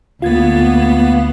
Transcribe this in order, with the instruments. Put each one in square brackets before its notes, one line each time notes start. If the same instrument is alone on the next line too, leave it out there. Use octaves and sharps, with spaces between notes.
[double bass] D2 [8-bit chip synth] A#3 F5 [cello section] B3 [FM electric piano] F4 G#6 A6